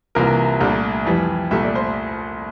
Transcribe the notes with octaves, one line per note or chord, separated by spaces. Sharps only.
C2 C3 E3 A#3 F4 A#4
C2 A#2 A3 D4
F2 E3 G3
C2 A#2 A3 E5
D5
C5